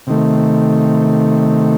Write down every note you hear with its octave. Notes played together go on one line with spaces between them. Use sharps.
C3 D#3 A3